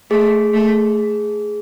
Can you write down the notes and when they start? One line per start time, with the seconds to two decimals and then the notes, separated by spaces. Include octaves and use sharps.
0.10 A3 G#4
0.53 A3